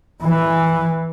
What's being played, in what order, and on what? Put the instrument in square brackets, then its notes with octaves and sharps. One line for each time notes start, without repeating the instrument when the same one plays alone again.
[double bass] E3